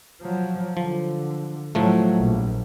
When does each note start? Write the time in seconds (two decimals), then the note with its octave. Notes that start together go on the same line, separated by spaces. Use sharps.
0.21 F3 F#3
0.77 D3 F3
1.75 A2 F3 F#3 A3
2.18 A#1